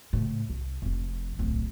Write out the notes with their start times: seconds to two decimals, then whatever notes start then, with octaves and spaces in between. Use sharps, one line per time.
0.13 C#2 A2
0.50 C2
0.82 F1 F2
1.39 D1 B1